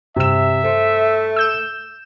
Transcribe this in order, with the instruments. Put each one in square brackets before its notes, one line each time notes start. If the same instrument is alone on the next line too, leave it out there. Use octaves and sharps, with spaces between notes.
[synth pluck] G2 E6 [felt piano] C3 E7 [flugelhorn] E5
[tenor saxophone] A3 [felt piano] C5
[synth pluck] E6 G6 E7